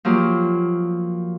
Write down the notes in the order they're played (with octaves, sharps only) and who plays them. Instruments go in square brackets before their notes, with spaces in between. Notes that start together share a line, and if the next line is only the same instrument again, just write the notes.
[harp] F3 F#3 A#3 G4